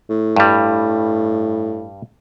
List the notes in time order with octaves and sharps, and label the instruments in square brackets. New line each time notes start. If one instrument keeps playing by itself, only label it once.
[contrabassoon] A2
[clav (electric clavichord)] G2 G3